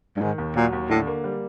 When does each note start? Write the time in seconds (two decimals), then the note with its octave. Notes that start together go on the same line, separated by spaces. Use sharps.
0.17 G2
0.21 G#2 D#3
0.38 D#2
0.56 A#2 F#3
0.73 D#2
0.89 A2 D3
1.07 A#3
1.24 G3